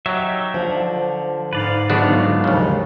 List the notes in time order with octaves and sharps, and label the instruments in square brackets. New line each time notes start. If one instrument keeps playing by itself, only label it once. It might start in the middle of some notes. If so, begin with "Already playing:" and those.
[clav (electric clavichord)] F#3 [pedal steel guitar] D#4 G4 E5
[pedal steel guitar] D3 [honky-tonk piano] F3
[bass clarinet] G#2 [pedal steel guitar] B4 D5 F5
[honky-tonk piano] G1 [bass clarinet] G#2 [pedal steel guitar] F#3 G#3 F4 [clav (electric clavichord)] B3 D4 F#4
[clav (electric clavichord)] D#2 C#3 [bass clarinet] F3